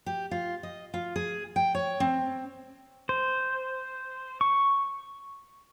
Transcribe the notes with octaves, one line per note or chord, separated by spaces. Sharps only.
G4
F4
D#5
F4
G#4
G5
C#5
C4
C5
C#6